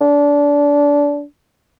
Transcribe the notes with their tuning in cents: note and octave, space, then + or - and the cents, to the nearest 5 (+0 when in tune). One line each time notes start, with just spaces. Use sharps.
D4 -25